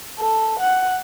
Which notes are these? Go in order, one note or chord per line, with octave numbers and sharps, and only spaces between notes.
A4
F#5